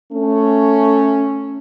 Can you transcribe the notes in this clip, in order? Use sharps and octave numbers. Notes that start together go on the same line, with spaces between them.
A3 C#4